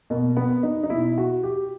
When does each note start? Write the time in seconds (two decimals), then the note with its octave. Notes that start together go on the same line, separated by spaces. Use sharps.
0.10 B2 A#3
0.37 B3
0.63 D#4
0.83 D#4
0.90 B2 E4
1.18 F#4
1.43 G4